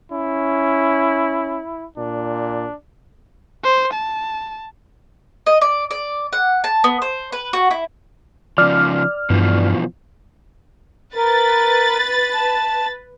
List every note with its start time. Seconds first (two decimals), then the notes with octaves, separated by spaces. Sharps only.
0.12 C#4 E4
1.97 A#2 D4
3.64 C5
3.94 A5
5.46 D#5
5.61 D5
5.91 D5
6.33 F#5
6.64 A5
6.84 B3
7.02 C5
7.32 B4
7.53 F#4
7.71 E4
8.58 C#3 F3 D5 F6
9.30 G2 B2 E3 F3
11.15 A#4 B4 A6
12.34 A5